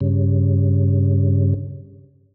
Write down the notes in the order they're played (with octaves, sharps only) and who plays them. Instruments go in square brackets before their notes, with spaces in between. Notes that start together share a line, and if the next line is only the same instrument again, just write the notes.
[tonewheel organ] G2 C#3